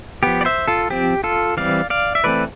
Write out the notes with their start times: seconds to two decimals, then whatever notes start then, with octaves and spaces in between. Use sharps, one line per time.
0.23 F3 B3 G4
0.41 D5
0.45 C5 E5
0.68 F4 A4
0.90 F3 C4 G4
1.24 F4 A4
1.57 E3 G3 C4 D5 F5
1.90 D5 F5
2.15 E5
2.24 E3 A3 C4 B4 D5